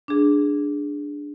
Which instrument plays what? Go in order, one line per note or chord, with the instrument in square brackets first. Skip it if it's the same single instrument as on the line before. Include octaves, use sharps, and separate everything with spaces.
[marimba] D4 G#4